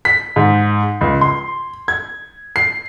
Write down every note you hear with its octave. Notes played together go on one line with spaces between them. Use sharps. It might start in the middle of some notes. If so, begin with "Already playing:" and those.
B6
G#2
C#2
C6
G#6
C7